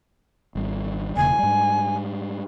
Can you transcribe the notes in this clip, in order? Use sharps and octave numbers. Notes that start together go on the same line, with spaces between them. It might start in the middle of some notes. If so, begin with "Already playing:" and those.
G#1 G3
E1 C#3 A#3 G#5
G#2 G3